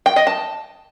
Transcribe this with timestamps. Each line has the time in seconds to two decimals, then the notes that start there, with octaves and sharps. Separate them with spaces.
0.06 G5
0.16 D#5
0.27 A5